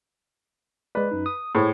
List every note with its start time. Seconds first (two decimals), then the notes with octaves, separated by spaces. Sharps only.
0.95 G#3 B4 D5
1.11 F#2 D#4
1.26 D#6
1.55 A2 G#4 C5 C#5